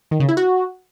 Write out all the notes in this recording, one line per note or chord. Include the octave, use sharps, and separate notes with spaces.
D#3
C#3
E4
F#4